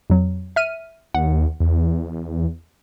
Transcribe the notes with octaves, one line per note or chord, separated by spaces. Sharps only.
F2 F#3
E5 F6 D#7
D#2 F#5
E2